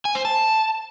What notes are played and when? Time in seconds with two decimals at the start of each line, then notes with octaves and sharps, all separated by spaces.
0.05 G#5
0.15 C5
0.25 A5